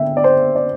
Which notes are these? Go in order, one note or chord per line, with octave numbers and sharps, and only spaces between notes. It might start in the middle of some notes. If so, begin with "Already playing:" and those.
Already playing: D3 E5 G5
D5
C5
D5